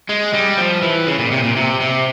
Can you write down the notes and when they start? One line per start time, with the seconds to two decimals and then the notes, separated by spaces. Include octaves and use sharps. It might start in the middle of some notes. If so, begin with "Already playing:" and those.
0.09 G#3
0.34 G3
0.58 F3
0.82 E3
1.07 C#3
1.19 A#2
1.31 C3
1.43 A#2
1.56 C3
1.81 C3